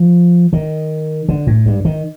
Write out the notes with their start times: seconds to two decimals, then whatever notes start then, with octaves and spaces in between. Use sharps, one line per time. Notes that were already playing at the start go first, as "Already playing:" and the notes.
Already playing: F3
0.53 D#3
1.29 D3
1.47 A2
1.66 G2
1.85 D#3